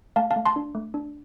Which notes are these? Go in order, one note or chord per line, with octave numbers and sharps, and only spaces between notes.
A3 F5 A5
F5 A5
A3
A5 C6
D4
A3
D4